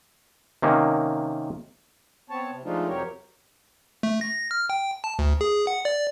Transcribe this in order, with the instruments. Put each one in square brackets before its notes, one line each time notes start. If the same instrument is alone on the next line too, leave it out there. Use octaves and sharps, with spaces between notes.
[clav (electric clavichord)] C3 D#3 A#3 C#4
[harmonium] B3 C4 C#5 A5
C3
F3 G#3 A3 D4 D#4 F4
F2 C3 F#3 G4 A#4 C#5
[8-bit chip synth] A3
A#6
F6
G5
A5
D2
G#4
F#5
D5